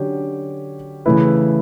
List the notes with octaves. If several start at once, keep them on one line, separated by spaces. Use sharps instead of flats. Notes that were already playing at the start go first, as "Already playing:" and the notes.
Already playing: D3 F#3 C#4 G4 C#5
C#3 E3 A3 E4 B4